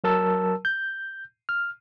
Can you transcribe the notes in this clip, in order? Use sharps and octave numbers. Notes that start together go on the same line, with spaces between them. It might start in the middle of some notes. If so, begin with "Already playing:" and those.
F#3 A#4 A5 E6
G6
F6